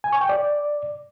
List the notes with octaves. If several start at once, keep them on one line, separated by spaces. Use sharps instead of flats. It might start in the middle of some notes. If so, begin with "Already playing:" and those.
G#5
C#6
G5
D5